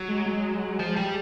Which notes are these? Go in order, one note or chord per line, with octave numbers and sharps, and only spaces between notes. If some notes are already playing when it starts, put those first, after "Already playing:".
Already playing: F#3
G#3
G#3
F3
G3